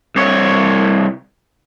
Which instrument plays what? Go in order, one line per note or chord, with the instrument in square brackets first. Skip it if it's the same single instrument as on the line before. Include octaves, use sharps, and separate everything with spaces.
[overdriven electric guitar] C2 C#5